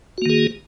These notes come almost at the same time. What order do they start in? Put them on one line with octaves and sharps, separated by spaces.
F#4 A#3 D#3 G#4